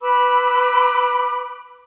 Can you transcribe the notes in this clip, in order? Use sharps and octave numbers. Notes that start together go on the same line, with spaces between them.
B4 B5 D6 E6